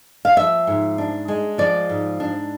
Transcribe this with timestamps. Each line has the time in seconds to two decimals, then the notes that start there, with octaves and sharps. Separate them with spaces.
0.25 F5
0.36 F3 E5
0.67 G#2
0.98 D4
1.28 G#3
1.58 F3 D5
1.89 G#2
2.20 D4